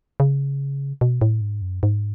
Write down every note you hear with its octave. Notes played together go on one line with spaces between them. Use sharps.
C#3
B2
A2
G#2
F#2
G#2